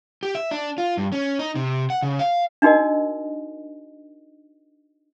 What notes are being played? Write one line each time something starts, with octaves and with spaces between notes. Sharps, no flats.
G4
E5
D4
F4
G2
C#4
D#4
C3
F#5
C#3
F5
D4 D#4 F#4 A#4 D#5